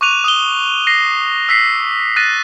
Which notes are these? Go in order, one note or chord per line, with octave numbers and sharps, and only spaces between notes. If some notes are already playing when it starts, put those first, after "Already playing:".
C#6 D6 F#6 D#7 F7
D#6 G7
A#6 C7 D#7
E6 B6 C7
F#6 A6 A#6 C7 D#7